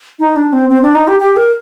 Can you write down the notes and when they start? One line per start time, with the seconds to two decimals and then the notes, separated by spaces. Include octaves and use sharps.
0.19 D#4
0.36 D4
0.53 C4
0.69 C4
0.82 D4
0.95 D#4
1.07 G4
1.20 G4
1.36 A#4